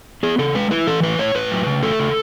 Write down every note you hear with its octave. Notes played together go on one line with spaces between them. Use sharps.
B3 G#4
C#3 A4
G#3 B4
E4 B4
E3 A4
A2 B4
A2 C#5
A2 B4
F#3
C#3
A3 A4
C#3